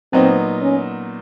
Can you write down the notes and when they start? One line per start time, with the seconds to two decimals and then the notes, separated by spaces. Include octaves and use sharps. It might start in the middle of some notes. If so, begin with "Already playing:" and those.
0.13 A#2 F#3 B3 C4 D#4
0.62 C#4